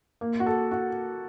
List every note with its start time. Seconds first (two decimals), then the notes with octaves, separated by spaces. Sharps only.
0.21 A#3
0.40 F#4
0.46 A4
0.71 F#4